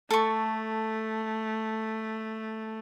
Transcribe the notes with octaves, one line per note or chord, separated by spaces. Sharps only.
A3 A4 C#6